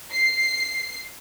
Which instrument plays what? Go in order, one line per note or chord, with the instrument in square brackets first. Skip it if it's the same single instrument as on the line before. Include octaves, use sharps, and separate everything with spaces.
[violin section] C7